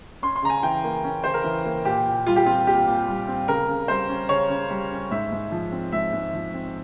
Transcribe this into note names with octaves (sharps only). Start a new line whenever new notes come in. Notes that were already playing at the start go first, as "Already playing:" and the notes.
C#4 C6
C6
C#3 A#5
G#5
E3 G5
A#3
C#4
C#3 C5
A#4
E3
A#3
A#2 G4
A#2
G3 F4
G4
C4 F4
A#2 G4
A#2
G3
C4
C#3 A#4
C#3
G3 C5
C#4
C#3 C#5
C#3
G3
C#4
G#2 E5
G#2
F3
C4
G#2 E5
G#2
F3
C4